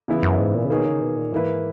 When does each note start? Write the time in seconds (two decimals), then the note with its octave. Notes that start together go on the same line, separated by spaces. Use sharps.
0.08 C#3 E3 B3 E4
0.23 F#2
0.39 G#2
0.55 A#2
0.65 C#3
0.70 B2 D#3 A#3 D#4 G#4 C#5
0.86 C#3
1.01 B2
1.16 A#2
1.32 G#2 E3 A#3 E4 B4